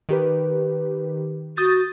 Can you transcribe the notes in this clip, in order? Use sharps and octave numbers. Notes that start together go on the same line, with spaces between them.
D#3 G4 B4
F#4 D#6 G6 A6